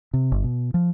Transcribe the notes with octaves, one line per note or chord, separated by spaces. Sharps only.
C3
G1
B2
F3